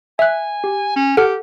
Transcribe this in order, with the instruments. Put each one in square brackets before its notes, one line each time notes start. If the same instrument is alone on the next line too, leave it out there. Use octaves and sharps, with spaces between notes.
[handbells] E5 F#6 [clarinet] G#5
[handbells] G4
[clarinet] C#4
[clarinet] G4 [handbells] A4 F#5 F6